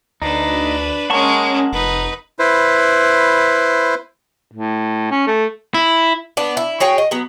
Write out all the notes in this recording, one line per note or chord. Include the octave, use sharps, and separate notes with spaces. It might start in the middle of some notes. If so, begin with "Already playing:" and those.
D2 D4 D#4 B4
G#3 A#3 C#4 F#5 A5 C#6
F1 D#4 B4
E4 B4 C5
A2
C#4
A3
E4
B3 D4
E4
F#4 G#4 C#5 G5
D#5
F#3 B3